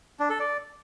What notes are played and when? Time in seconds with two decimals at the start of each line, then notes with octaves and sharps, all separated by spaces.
0.20 D4
0.30 A4
0.39 D5